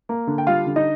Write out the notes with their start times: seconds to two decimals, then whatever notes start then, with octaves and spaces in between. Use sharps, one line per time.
0.09 A#3
0.27 D3
0.38 G5
0.47 G3 F4 F5
0.67 D3
0.76 D#4 D#5